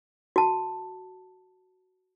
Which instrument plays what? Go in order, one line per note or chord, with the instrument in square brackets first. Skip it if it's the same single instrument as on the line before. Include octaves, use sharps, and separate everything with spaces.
[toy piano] F#4 A5